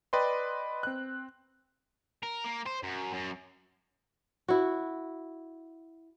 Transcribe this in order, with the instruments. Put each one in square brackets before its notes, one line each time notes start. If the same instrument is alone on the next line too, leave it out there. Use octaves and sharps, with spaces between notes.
[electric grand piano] B4 D5 D#5 G5 C6
C4 F#6
[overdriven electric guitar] A#4
A#3
C5
F#2
F#2
[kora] E4 F#4